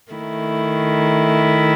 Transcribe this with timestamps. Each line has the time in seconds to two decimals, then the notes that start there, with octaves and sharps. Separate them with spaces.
0.11 D#3 A3 E4